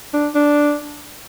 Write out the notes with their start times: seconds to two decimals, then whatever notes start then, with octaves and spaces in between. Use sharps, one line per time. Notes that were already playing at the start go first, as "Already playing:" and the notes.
0.14 D4
0.35 D4